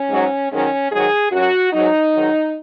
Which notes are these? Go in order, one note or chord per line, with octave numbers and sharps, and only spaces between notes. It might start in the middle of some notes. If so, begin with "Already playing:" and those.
Already playing: C#4
G#2 F#3
G#2 D#3 F#3 C#4
G#2 D#3 F#3 G#4
F#2 F#3 F#4
G#2 F#3 D#4
G#2 D#3 F#3